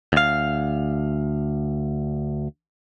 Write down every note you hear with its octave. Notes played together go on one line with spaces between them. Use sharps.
D2 F5